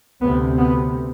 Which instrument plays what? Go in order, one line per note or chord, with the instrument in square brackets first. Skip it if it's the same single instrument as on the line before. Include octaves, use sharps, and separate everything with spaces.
[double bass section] D2 C3 B3
B3